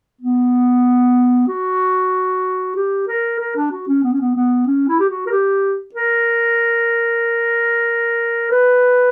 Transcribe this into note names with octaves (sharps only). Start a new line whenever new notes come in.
B3
F#4
G4
A#4
A#4
D4
F#4
C#4
B3
C#4
B3
B3
C#4
E4
G4
F#4
A#4
G4
A#4
B4